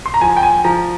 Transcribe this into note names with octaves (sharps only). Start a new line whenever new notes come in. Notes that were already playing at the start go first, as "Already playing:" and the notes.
C6
A#5
F3 G#5
G5
G#5
F3 A#5